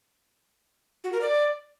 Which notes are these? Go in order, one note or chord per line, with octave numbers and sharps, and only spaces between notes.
F#4
A#4
D5